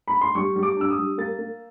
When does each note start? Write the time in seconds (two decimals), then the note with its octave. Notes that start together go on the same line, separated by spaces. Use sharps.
0.08 B5
0.21 C6
0.35 G3 C#6
0.56 G3
0.63 D6
0.77 D4 E6
0.90 D#6
0.98 G3
1.18 A#3 A6
1.39 A#3